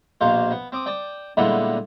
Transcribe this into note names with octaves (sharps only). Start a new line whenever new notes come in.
A#1 B2 A#3 C5 F5
B3
C4 D6 D#6
D5 G5 A5 D#6
A#2 D3 G3 G#3 B3 E4